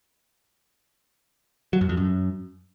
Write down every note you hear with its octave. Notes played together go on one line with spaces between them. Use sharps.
F#3
F#2
F2
F#2